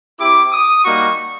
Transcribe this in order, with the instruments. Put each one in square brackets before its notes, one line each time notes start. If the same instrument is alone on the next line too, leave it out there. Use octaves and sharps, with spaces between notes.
[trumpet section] C4 E4 G4 D6
D#6
G3 A#3 D#4 F#4 C#6